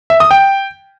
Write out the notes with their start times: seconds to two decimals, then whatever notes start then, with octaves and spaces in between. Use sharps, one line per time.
0.10 E5
0.20 D#6
0.31 G5